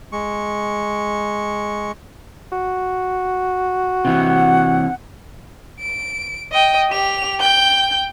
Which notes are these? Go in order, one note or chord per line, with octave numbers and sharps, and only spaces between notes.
G#3 C#6
F#4
C3 E3 F#5
D7
D#5 G5
G4 F7
G5 G6